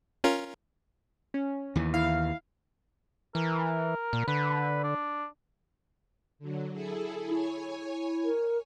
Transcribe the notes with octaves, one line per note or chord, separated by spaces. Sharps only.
C#4 F4 A#4
C#4
D#2 E3
E4 F5
E3 A#4
A#2
D3 B4
D4
D3 F#3
E4 G#4 A4
E4 C#5 G#5
A#4